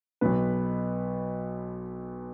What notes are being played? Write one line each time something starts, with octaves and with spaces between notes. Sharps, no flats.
B1 B2 B4